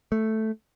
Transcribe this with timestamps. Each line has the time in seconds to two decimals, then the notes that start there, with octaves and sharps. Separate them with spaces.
0.12 A3